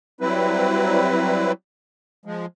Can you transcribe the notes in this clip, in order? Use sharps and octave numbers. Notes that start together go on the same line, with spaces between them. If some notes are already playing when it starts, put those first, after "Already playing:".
F#3 G3 C4 E4 B4
F3 G#3